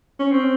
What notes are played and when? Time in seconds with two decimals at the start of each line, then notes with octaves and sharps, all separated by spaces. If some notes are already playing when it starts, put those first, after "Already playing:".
0.19 C#4
0.32 C4